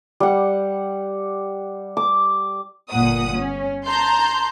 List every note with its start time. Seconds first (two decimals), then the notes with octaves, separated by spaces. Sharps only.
0.20 G3 F#5
1.97 D6
2.92 G1 A#2 F#5 D#6
3.38 C#4
3.86 A5 A#5 C6 G6